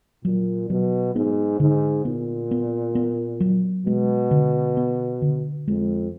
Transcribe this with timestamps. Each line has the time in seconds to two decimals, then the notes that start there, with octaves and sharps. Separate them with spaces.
0.24 A#2 F#3
0.70 B2 F#3
1.15 G#2 B3
1.60 G#2 D3
2.05 A#2 B3
2.51 B3
2.95 B3
3.40 F#3
3.86 B2 G#3
4.31 D3
4.77 B3
5.22 D3
5.67 F2 G#3